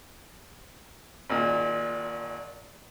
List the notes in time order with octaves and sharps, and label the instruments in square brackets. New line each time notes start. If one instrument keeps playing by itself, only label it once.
[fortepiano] G#1 A#2